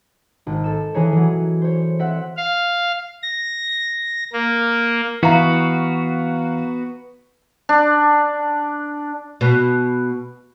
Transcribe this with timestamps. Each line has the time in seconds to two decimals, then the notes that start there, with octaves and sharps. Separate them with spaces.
0.47 G#1
0.64 A4 E7
0.94 E3 C#4 G#4 A#4 C#5
1.12 E3 F#3
1.62 C5 C#5
1.99 C4 E5 F#5
2.37 F5
3.23 A#6
4.33 A#3
5.23 E3 B3 F#4 F5 A#5
7.69 D4
9.41 B2